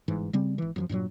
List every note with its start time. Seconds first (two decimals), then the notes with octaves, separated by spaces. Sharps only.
0.08 G1 G#2 E3
0.33 C#3 G3 C4
0.58 G#1 E3
0.76 F#2 C#3 F3
0.89 G2 A#2 C#3 F#3